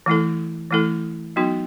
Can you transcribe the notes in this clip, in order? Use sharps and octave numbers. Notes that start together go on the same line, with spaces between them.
E3 A3 E4 A4
E3 A3 E4 A4
F#3 B3 D#4 F#4